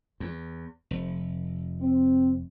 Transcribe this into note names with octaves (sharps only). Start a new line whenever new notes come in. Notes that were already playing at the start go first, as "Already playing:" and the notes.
E2
F1
C4